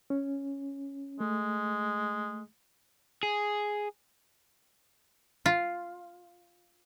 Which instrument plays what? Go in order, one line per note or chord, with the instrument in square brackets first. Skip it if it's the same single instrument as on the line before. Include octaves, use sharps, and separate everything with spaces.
[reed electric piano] C#4
[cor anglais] G#3 [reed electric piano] A3
[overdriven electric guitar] G#4
[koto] F4